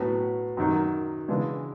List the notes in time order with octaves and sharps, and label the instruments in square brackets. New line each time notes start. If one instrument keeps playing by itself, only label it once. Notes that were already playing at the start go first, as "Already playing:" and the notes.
Already playing: [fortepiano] A2 F#3 B3
F#2 D#3 F#3
C#3 E3 G#3 B3 D4